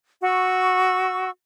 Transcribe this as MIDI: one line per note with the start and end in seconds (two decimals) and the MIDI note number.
0.23 1.29 66
0.23 1.29 85
0.23 1.29 88